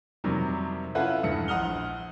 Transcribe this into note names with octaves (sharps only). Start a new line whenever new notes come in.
F2 C3 D#3 F#3 G3
C#4 E4 F4 A4 B4 F#5
E2 G2 C#7
A#1 F#5 D#6 F6 G7